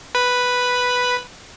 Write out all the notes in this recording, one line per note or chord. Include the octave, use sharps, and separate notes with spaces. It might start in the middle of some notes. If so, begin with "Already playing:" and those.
B4 B5